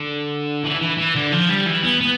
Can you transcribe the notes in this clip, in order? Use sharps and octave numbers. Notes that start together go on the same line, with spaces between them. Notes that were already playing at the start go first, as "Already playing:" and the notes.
Already playing: D3
E3
E3
E3
D3
F3
G3
E3
B3
B3